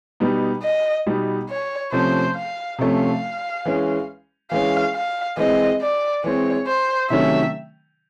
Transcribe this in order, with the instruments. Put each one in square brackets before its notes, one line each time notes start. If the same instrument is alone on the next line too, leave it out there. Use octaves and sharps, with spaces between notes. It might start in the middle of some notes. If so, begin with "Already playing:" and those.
[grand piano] B2 G3 B3 D#4
[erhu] D#5
[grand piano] B2 G3 B3 D#4
[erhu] C#5
[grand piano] C3 F3 A3 C#4 [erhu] C5
[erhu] F5
[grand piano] C3 F3 A3 C#4 [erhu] F5
[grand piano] E3 G#3 C#4
[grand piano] E3 G#3 C#4 [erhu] F5
[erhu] F5
[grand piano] E3 G#3 C4 [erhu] D#5
[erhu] D5
[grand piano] E3 G#3 C4 [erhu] C#5
[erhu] C5
[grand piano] C3 D#3 F#3 A3 C#4 [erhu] E5